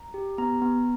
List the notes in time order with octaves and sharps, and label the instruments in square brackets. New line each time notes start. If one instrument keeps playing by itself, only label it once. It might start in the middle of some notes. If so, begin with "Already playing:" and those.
Already playing: [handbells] A#5
G4
B3 A#5
B3